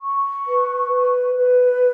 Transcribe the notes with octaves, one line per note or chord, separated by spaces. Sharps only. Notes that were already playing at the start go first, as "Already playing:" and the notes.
C#6
B4
B4
B4